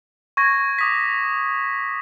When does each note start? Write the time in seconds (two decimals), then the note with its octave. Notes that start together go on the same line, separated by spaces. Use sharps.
0.37 C#6 G#6 A#6
0.79 D6 D#6 B6